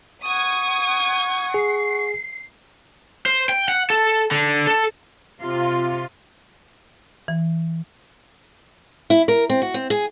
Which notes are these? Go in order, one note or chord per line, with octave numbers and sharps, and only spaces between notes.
F#5 C#6 D#6 G#6
G#4 C7
C5
G5
F#5
A4
D3
A4
C3 F4
E3
E4
A#4
C4
F#4
C4
G#4